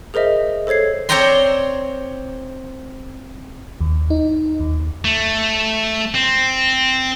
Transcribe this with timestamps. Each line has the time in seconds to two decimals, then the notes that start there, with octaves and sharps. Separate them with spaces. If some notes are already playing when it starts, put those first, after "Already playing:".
0.14 G#4 A#4 C5 D#5 E5
0.67 A4 C5 C#5 G#6 C7
1.09 C4 C#5 D5 G5 A#5 C6
3.81 D#2
4.10 D#4
4.60 D#2
5.05 A3
6.14 C4